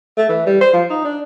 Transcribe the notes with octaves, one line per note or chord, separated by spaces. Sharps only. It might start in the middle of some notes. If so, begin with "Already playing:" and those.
A3
E3
G3
C5
F3
D#4
D4